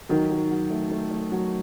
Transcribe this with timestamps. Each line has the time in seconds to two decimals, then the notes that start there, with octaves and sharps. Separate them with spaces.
0.09 D#3 F#3
0.31 F#3
0.51 F#3
0.70 A3
0.91 A3
1.11 A3
1.32 F#3